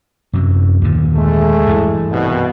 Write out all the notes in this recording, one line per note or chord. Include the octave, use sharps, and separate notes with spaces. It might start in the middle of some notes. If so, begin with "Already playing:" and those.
F#2 C3 F#3
D#2 A#2 D3
G#3 A3
G2 E3
C2 B2